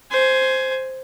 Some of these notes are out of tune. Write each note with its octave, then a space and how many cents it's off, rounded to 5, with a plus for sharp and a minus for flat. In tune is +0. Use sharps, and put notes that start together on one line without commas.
C5 +0 G#5 +10